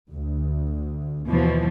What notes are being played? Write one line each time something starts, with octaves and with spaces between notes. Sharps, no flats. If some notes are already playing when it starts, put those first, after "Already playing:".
D2
D#2 B2 E3 F3